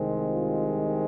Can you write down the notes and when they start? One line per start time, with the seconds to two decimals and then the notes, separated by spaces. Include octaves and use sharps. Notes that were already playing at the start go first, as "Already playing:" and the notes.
Already playing: C2 C3 D#3 G#3 C4
0.29 F4